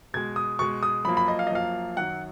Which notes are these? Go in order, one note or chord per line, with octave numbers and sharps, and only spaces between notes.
B2 G#3 G#6
D#6
B2 G#3 C#6
D#6
F#2 F3 A#3 B5
B5
D#5
F5
D#5
F#2 F3 A#3 F5
F#2 D#3 F#3 F#5